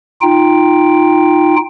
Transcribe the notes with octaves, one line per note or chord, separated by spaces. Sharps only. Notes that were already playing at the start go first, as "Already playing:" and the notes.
D#4 F4 G5